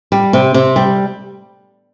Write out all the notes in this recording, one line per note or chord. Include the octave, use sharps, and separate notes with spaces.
G3
C3
C3
G3